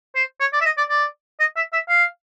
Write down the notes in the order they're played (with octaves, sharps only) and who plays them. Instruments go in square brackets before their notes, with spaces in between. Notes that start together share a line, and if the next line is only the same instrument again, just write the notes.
[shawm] C5
C#5
D5
E5
D#5
D5
D5
D#5
E5
E5
F5